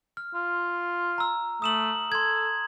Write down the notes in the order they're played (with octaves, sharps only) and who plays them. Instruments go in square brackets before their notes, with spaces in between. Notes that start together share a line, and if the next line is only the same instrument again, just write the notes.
[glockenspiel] F6
[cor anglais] F4
[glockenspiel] A#5 E6
[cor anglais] A3 [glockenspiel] D#6 E7 F#7
[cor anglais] A4 [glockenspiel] C6 G#6